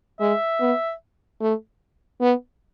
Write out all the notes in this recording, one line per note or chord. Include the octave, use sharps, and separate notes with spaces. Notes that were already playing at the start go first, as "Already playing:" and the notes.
G#3 E5
B3
A3
B3